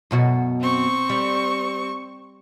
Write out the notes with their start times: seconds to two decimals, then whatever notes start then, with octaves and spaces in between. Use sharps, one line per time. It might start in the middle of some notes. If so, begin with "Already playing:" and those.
0.11 F#2 B2 F#4
0.61 C4 C#6
1.10 G3